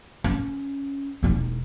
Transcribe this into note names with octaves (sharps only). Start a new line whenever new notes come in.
C#4
E1 D#4